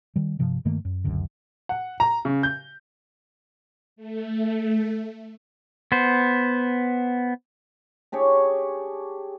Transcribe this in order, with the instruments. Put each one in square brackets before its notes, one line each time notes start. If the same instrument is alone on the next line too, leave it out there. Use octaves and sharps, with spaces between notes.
[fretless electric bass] D#3 G3
G2 C3 F3
G2 D#3 A3 A#3
F#2
F1 C#2 F#2 D3
[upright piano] F#5
A#5
C#3
G6
[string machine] A3
[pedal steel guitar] B3 C5
[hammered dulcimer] D4 G4 G#4 C#5